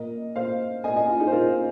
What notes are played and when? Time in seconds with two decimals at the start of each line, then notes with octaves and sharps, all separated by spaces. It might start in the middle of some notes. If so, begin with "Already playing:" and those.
Already playing: A#2 A#3 A#4 D#5
0.36 A#2 A#3 C5 F5
0.84 A#3 D#5 G#5
0.88 A#2
0.96 D#5 G#5
1.08 F4
1.20 D#4 G#4
1.27 C5
1.32 A#2 A#3 F4 A#4